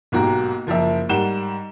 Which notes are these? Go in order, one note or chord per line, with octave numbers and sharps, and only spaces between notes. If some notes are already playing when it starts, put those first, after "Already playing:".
B1 G#2 A#3 F#4 G4 A#5
F#1 F3 A#3 A#4 E5
G#2 G3 A#4 F#5 E7 G7